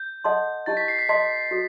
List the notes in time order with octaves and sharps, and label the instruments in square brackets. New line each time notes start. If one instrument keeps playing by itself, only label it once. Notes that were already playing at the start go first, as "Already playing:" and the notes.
Already playing: [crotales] G6
[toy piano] A4 D#5 F#5 A5 C6
[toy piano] E4 G4 D#5 A5 [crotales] A6
[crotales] B6
C7
B6
[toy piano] A4 D#5 A5 C6 [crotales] B6
[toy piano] F#4 A4